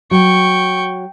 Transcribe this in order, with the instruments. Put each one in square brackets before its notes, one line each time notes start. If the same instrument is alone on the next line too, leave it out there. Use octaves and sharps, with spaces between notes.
[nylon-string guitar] F#3 [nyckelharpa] G5 C#6